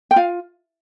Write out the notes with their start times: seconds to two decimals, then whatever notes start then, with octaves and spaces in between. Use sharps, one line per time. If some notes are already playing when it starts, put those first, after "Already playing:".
0.11 G5
0.16 F4 F5